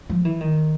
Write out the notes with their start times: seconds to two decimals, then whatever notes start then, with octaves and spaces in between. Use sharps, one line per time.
0.09 F3
0.25 E3
0.41 D#3